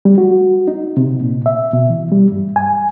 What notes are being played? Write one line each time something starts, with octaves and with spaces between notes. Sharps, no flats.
G3
F#4
D#4
C3
A#2
E5
B2
E3
G3
G2
G#5